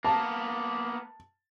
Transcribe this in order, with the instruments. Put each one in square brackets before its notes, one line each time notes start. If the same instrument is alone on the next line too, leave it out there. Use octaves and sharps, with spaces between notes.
[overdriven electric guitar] A#3 B3 [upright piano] A5